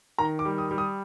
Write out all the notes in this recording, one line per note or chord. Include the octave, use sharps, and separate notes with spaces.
D#3 A#5
D6
G3
D#6
G3
D#6